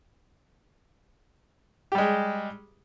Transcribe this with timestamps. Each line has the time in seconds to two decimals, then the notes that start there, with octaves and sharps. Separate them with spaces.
1.92 G4
1.95 G3
1.98 G#3